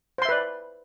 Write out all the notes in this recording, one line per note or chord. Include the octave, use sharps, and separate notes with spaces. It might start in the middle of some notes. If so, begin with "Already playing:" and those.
B4 C5 D5 E5 C6